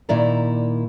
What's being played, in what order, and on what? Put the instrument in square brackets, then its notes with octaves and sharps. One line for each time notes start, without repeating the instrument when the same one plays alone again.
[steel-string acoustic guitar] A#2 D#3 E4 D5 E5 A#5